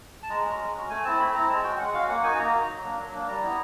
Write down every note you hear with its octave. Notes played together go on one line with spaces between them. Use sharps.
A5
G#3 A#5
C#4 F#4
G#3
C#4 F#4
A3 G#5
C4 E4 A5
A3 B5
C4 E4 A#5
G#3 A5
C#4 F#4 G5
G#3 F#5
C#4 F#4 F5
A#3 F#5
D#4 F#4 G#5
A#3 A#5
D#4 F#4
F#3
A#3 D4
F#3
A#3 D4
G3 A#5
B3 E4